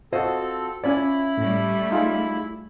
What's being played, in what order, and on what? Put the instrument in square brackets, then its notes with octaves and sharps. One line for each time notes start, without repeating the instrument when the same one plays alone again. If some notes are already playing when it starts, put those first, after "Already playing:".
[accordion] C4 A4 [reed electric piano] F4 F#4 [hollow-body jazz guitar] C5 D#5
[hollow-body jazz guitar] C#4 C#5 D5 [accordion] E4 B5 [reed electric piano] F4
[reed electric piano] A2 [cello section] G3 A3
[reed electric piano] D#4 F4 G#4